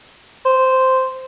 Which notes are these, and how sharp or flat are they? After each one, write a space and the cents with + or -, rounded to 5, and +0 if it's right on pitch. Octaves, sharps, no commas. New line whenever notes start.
C5 -5